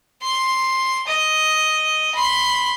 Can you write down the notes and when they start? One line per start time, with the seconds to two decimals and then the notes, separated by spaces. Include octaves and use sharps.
0.23 C6
1.07 D#5
2.15 B5 C6